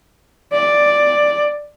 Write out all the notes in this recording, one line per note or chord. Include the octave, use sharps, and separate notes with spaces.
D5